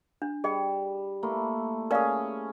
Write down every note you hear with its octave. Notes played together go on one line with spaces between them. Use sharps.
D4
G3 G#4 D#5 G5
A3 A#3 E4
C#4 G#4 A#4 D5 F5